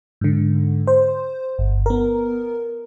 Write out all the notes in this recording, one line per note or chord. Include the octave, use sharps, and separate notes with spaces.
G#2 D3
C5
G1
B3 A#4